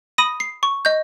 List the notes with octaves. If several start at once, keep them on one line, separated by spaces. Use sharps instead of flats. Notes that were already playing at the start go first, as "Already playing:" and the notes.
B5 D#6 A#6 D#7
C7
C#6
D#5 G6